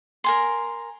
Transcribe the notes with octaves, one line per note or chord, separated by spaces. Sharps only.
A#4 G#5 C6